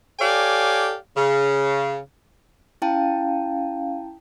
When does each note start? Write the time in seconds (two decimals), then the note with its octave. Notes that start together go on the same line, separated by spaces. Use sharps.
0.19 G4 A4 C#5 D5 F5 G#5
1.16 C#3
2.82 C#4 E4 F5 G5 A5